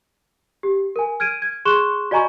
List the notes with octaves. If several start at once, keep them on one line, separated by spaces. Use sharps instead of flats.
G4
A#4 G#5
F6 G#6 D7 D#7
G#6
G#4 C6 C#6 F#6 E7 G7
F#4 D5 D#5 G#5 A#5 C#6